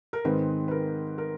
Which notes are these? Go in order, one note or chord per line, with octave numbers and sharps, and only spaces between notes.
A#4
G#2 D#3 G#3 C4 B4
B4
A#4
A#4